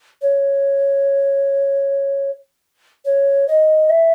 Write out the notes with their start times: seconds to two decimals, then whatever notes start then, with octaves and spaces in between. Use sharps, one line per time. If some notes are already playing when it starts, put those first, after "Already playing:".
0.22 C#5
3.05 C#5
3.48 D#5
3.90 E5